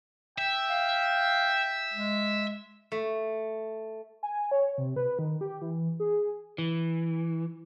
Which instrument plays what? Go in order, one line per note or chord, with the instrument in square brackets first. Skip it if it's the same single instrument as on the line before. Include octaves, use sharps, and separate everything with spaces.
[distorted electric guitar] E5 [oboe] G5
[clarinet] F5
G#3
[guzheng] A3
[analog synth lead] G#5
C#5
C3
B4
D#3
G4
E3
G#4
[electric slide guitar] E3